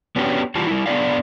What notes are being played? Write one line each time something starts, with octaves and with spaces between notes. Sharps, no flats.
B3 C#4 D4 F#4 G4
E3 G3 F4 F#4 A5
G3 E4
B3 D4 G#4 D5 F5